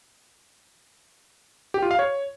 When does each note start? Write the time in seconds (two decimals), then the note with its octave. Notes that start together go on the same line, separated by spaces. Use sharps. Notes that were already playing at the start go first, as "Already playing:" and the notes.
1.74 G4
1.82 F4
1.91 F5
1.99 C#5